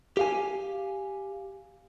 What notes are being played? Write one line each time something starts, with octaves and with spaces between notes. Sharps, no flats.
G4 F5 G#5